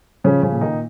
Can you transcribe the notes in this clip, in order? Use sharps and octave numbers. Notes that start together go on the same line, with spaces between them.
C#3 F3 C#4
C#3 C#4
A#2
D#3 D#4